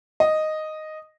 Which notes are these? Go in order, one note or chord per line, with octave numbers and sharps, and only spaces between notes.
D#5